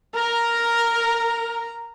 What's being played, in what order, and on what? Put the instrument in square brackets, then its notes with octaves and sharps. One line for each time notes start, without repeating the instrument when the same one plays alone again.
[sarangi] A#4 [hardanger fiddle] A#5